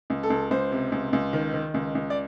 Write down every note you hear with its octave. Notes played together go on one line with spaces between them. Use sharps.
C#2
A4
C#2
C#2 C5
C3
C#2
C#2
D#3
D#3
C#2
C#2
D5